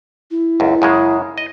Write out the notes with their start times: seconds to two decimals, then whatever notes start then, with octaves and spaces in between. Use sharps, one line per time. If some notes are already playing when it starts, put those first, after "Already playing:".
0.31 E4
0.60 C#2 F#2
0.82 F#2 C#3 G#3
1.38 D#5